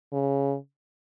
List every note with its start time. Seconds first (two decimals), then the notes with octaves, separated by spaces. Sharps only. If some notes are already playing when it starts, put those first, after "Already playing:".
0.13 C#3